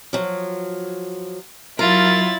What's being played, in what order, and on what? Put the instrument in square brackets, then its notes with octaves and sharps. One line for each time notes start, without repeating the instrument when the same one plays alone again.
[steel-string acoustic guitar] F3 F#3
[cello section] F#3 [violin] E4 A6 [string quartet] F4 [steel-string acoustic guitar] A#4